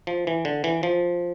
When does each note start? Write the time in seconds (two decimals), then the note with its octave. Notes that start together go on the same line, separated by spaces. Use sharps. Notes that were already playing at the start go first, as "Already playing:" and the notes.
0.07 F3
0.27 E3
0.45 D3
0.64 E3
0.83 F3